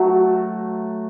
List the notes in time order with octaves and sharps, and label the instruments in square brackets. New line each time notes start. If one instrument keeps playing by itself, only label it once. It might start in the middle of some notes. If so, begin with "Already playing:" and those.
Already playing: [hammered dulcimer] F#3 A3